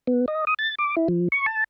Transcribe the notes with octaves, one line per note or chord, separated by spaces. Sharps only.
B3
D#5
D#6
A6
D6
E4
F3
C#6
A5